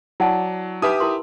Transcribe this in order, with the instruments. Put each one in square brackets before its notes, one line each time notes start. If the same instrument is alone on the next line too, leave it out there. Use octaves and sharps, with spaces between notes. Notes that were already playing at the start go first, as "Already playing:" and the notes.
[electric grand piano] F#3 D5 [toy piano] E4 F#5 A5
[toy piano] D#4 B4 B5 [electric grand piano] G4 E5 D#6
[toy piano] E4 A#4 C6